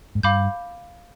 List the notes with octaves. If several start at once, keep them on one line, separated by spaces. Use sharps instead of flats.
G#2
G2 F5 B5 D6 G6